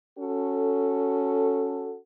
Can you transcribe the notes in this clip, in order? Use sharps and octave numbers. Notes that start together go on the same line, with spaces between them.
C#4 F#4 A4